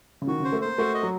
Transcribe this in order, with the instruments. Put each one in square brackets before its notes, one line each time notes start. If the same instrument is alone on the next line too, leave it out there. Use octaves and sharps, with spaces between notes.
[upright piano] C#3
[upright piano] D#3 [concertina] F#4
[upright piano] C#3 [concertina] C5
[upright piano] A3
[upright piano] A#3 [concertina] C5
[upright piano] A3 [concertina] F#4
[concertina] D#5
[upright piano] F#3